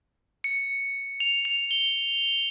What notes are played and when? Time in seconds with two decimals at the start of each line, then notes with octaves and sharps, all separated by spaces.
0.44 C#7
1.20 F7
1.45 F7
1.71 G7